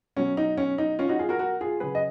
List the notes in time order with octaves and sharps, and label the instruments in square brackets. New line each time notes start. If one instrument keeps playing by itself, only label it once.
[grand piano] B2 F#3 C#4
D#4
C#4
D#4
C#4 F4
D#4 F#4
F4 G#4
F#4 A#4
F#4 A#4
F4 G#4
C#3 F#3 G#4 B4
D#5